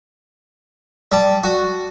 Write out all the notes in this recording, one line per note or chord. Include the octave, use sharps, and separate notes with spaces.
G3 A5
F#4